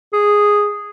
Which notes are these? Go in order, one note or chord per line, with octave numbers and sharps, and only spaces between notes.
G#4